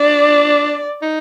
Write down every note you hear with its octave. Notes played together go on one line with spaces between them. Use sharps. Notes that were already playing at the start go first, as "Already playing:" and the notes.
Already playing: D4 D5
D#4